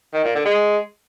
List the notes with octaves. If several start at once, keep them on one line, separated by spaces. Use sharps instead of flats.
D#3
A#2
D3
G#3